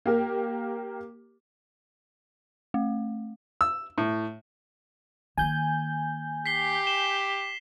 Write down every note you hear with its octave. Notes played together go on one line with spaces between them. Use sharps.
A#3 G4 A#4
A3
E6
A2
D#3 A#3 G#5 G6
G4 B6 C7 G7
E7 G7